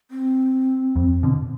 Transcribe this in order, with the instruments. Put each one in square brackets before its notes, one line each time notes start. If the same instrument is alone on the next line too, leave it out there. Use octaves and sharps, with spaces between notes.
[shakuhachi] C4
[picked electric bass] F2
B2 D3